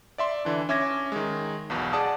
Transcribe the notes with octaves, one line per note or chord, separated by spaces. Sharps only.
D5 E5 C6
D3 E3 D4
C#4 E5 D6 G#6 A#6
D#3 G#3
B1 E2 B2
G#4 D5 F#5 A5 D6 D#6